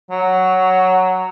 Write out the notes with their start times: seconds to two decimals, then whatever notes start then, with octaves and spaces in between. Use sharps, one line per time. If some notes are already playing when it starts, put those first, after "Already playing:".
0.11 F#3